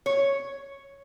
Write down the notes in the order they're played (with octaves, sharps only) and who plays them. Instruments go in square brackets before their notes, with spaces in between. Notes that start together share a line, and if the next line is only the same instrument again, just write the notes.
[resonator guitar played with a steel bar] C#5